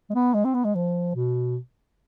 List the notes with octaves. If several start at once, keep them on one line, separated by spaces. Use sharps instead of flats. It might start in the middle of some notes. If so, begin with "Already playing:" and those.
G#3
B3
G#3
C4
B3
G#3
F3
B2